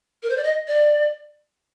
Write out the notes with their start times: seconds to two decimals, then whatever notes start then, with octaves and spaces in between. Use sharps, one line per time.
0.23 A#4
0.30 C5
0.37 D5
0.44 D#5
0.68 D5